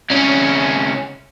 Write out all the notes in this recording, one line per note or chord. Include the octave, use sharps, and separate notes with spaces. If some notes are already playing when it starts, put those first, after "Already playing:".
C2 C#4